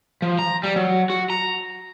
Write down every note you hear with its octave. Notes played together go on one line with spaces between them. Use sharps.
F3
A#5
G3
F#3
F#4
A#5